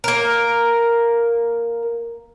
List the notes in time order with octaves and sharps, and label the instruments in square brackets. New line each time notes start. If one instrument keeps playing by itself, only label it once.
[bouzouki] A#3 A#4